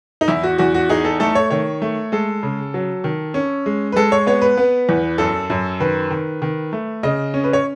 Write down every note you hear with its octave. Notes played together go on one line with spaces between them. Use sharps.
D#4
E2 E4
F#4
E2 F#4
F#4
D#4 G#4
A4
A3 A4
C#5
D#3 C#5
A3
G#3 A4
C#3
F#3
D#3
C#4
G#3
B4
G#3 A4
C#5
B3 C#5
B4
B3
E2
F#2 A4
F#2
D#3 B4
D#3
D#3
A3
C#3 D#5
C#4
B4
C#5